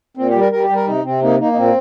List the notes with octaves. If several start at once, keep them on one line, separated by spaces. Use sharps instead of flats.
A#2 C4
G4
G3
A#4
G3 A#4
G4
G3
A#4
C3 D#4
C3 C4
A#3 D#4
A#3 D#4
D#4
A#2 C4